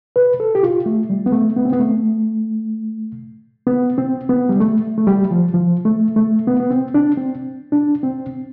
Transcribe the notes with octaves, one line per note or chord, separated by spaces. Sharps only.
B4
A4
G4
F4
A3
G3
B3
A3
B3
C4
B3
A3
B3
C4
B3
G3
A3
A3
G3
F3
F3
A3
A3
B3
B3
C4
D4
C4
D4
C4